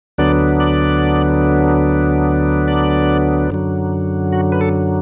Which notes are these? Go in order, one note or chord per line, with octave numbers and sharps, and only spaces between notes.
D2 D3 F#3 B3 D4 D5
D5
D5
F#2 D3 F#3
F#4
B4
A4